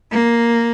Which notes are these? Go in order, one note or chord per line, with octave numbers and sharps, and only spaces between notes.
A#3